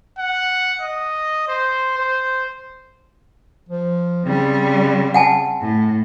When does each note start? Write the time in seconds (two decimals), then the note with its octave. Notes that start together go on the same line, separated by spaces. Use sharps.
0.18 F#5
0.81 D#5
1.48 C5
1.98 C5
3.69 F3
4.25 C#3 G3 C4
5.14 F#5 G#5 A5
5.60 A2